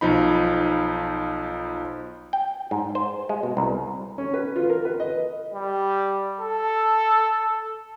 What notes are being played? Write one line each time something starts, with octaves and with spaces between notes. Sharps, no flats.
B1 F3 D#4 B5
G5
G#2
C5
G#3
B2
C2
C#4
B4
F4
A#4
B4
D#5
G3
A4